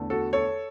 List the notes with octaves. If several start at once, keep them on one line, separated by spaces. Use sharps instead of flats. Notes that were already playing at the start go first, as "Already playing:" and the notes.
Already playing: E2 D3 A3
F#4 A4
A4 C#5